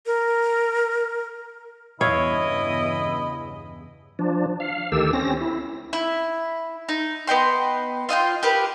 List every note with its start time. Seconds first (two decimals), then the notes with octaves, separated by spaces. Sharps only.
0.06 A#4
2.01 E2 G2 C#3 E4 C#5 D#5 F5
4.19 F3 D4
4.60 F5
4.92 D2 D#3 G4 A4 E6
5.13 C4 C#4 A#6
5.41 E4
5.93 E4
6.89 D#4
7.27 B3 D#5 G5 C6
8.09 F4 D#5 F#5 G5
8.43 G4 A#4 B4